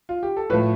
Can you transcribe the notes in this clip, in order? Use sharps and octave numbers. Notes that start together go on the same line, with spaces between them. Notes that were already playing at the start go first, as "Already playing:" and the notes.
F4
G4
A4
A2 F3 A3 B4